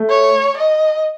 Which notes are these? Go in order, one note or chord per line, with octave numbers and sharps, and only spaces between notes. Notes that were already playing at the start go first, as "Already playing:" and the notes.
Already playing: A3
C#5
D#5